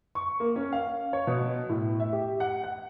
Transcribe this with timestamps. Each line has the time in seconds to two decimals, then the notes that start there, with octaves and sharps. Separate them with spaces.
0.15 C#6
0.40 A#3
0.56 C#4
0.73 F5
1.13 C#5
1.27 B2
1.69 A2
2.00 E5
2.13 G4
2.40 F#5
2.64 F#5